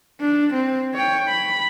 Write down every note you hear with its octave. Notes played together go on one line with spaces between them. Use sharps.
D4
C4
C#5 G5
B5